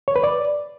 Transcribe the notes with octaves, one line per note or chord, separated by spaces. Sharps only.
C#5
B4
D5